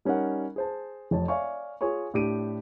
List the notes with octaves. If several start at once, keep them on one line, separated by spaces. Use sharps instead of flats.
G3 C#4 D#4 A#4 F#5
G#4 C5 A5
F1 F2 C#5 A5
C#5 D5 E5 F5 G#5 C#6
F4 G#4 C#5 G#5 C#6
A2 D4 G4 D7 D#7